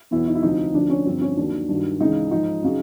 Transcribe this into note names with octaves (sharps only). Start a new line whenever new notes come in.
E2 B2 F#3 E4
D#4
E4
D2 C3 F3 D#4
D2 D3 F3 D4
C#4
G2 D3 F3 C4
C#4
D#2 D#3 F#3 D4
G2 D#3 F#3
C#2 C#3 E3 D#4
G#2 F3 D#4
C#3 F#3